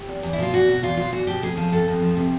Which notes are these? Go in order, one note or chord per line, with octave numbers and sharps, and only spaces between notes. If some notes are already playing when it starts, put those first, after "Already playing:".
Already playing: G4
E2
E2
E4
B2 F4
E2 F#4
B2
E2 F4
B2 F4
E2 F#4
B2 G4
F2 G#4
F3 G#4
F2 A4
F2
F3
C3